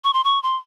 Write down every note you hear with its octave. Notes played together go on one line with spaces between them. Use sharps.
C#6
C6
C#6
C6